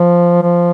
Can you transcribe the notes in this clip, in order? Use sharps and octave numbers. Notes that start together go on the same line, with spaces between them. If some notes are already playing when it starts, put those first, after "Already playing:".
Already playing: F3
F3